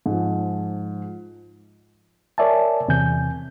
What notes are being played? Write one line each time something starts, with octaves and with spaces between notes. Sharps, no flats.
G#2 F3
A#4 C#5 D5 E5 G#5 A5
E2 C3 E3 G#5 G6